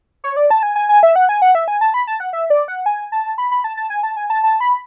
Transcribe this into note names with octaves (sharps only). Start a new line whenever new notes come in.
C#5
D5
A5
G#5
G#5
G#5
E5
F#5
G#5
F#5
E5
G#5
A5
B5
A5
F#5
E5
D5
F#5
G#5
A5
B5
B5
A5
A5
G#5
A5
G#5
A5
A5
B5